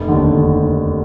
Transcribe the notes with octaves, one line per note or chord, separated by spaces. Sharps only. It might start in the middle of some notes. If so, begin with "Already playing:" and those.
Already playing: F1
D#2 D3
F1